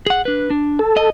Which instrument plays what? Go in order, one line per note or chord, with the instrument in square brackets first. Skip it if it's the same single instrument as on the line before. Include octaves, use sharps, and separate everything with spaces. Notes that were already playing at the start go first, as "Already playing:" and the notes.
[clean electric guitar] G#4 F#5
D4 B4
D4
[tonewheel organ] A4
[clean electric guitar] D#5